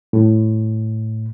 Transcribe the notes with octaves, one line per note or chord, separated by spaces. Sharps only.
A2